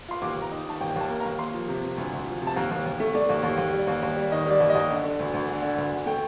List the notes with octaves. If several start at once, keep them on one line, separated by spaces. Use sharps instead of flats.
F4 C6
D#2 D6
D#2
A#5
D#4
D#3 A5
D#2 G5
D#2 A5
A#3
D#2 A#5
A#3 C6
F3
C3
C3
D2
D2
F3
C3
A5
D#2 A#5
D#2
D#2
A3
A3 D5
D#2
D#2
D#2
G3
D#2
D#2
G3
D#3 D#5
G3 D5
D#2
D#5
D#2
D3
D3
D2
D2
D3
D3
D2
D2
A3 G5